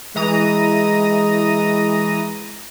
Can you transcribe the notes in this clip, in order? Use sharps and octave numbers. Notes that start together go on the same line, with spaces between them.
E3 G#3 A#5 D#6